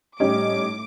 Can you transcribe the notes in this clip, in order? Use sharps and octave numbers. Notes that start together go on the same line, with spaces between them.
A2 G3 C#4 D#4 G4 D6